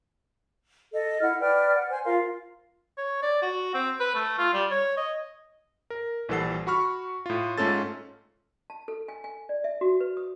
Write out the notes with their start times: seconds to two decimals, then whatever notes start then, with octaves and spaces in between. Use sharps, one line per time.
0.93 A4 D#5
1.22 E4 F#5 F6
1.40 B4 D5 G5 F6
1.77 F#5
1.91 C5 G#5
2.05 F4 A#4 F5 C6
2.98 C#5
3.22 D5
3.42 F#4
3.74 C4
4.00 B4
4.15 A3
4.38 F4
4.54 G3
4.71 C#5
4.97 D#5
5.90 A#4
6.29 A#1 E3 G3 A4 F#5 C7
6.67 F#4 B5 C#6 F6
7.26 A2 F4
7.58 G#2 A3 C#4 F4 A4 A6
8.70 A5
8.88 A4
9.08 G#5
9.24 G#5
9.49 D5
9.64 E5
9.81 F#4
10.00 B4
10.17 D#6